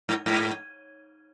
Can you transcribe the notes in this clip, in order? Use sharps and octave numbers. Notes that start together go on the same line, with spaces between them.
G#2
G#2